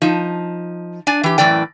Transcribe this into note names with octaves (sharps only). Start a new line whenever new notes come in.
F3 D#4
D4 D5 G#5
E3 G4
F#2 A2 E3 D5 G5